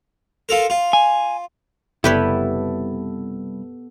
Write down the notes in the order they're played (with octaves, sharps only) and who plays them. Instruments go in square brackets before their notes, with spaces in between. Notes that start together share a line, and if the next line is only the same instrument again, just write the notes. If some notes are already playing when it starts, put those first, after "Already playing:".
[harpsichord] F4 A4 A#4
F4
[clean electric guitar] G#5
[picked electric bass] F#1 [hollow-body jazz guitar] C2 E4 [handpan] B3 A4 [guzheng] G4 B4 C#5